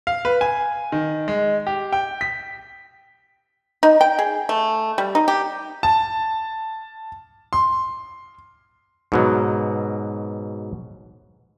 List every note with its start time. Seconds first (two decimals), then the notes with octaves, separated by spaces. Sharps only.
0.07 F5
0.25 B4
0.41 G#5
0.92 D#3
1.28 G#3
1.67 G4
1.92 G5
2.21 B6
3.83 D#4
4.01 G5
4.19 G#4
4.49 A3
4.98 G3
5.15 D#4
5.28 G4
5.83 A5
7.53 C6
9.12 G#2 B2 F#3